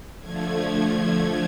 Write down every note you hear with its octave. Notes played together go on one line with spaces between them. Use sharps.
D3 F3 A3 G#6